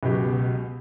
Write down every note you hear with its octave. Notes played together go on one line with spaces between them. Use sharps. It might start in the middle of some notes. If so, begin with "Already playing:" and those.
C#2 B2 F#3 G4